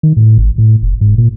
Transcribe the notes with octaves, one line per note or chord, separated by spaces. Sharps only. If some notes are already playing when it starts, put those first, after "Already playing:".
D#3
A2
G#1
A2
F1
G#2
A#2